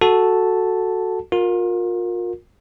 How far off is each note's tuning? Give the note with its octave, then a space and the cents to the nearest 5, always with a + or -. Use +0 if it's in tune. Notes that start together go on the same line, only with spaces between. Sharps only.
F#4 +0 A4 +0 A5 +0
F4 +35 A#4 +0